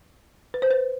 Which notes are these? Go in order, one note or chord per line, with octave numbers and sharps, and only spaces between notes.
B4
C5
B4